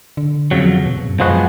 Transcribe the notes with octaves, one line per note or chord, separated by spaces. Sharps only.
D3
F2 C#3 F#3
B2
B2
F#2
F#2 F3 G#3 B3 F#4